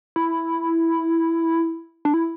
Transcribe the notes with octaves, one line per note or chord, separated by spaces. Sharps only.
E4
D4
E4